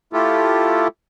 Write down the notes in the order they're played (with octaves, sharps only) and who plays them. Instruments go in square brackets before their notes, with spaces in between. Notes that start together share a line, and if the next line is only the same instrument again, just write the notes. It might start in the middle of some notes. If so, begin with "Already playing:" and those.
[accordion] A3 E4 F4 G4 A4